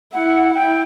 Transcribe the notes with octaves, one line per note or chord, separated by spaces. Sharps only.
E4 F#5
F#5
E4 G5